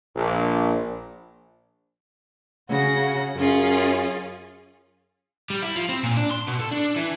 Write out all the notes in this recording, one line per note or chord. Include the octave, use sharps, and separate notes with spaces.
A#1
C#3 F#4 A#6
F#2 C#4 F4 G#4
G3
E4
F3
C4
A#2
D4
C6
B2
A4
D4
E3